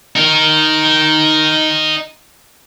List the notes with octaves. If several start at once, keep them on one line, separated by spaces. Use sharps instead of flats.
D#4 A#4